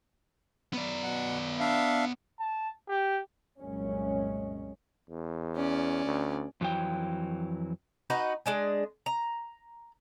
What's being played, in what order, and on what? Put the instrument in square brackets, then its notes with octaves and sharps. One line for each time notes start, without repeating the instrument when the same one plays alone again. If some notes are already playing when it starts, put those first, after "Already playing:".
[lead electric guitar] B3 D5
[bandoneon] B2 F#5
D4 E5 F5
[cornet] A5
G4
[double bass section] C2 F#2 A#2 G#3 C#4
[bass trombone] E2
[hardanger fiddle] C#4 D5
[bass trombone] D2
[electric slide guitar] F2 E3 F#3 G5
[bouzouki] D#4 F#4 B4
G#3 D4 G#4
A#5